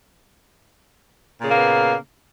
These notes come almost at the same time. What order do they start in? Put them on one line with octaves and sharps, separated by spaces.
A#2 C#3 A#3 B3